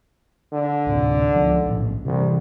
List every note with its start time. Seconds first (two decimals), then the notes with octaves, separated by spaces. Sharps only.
0.53 D3
0.86 D2 A2 C3
1.35 C#2 F3
1.66 A#1 A2
2.05 C2 C3 E3